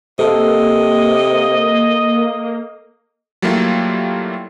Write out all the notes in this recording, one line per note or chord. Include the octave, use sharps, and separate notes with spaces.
C3 A#3 A4 D#5
F#3 G3 A3 A#3 E4 F4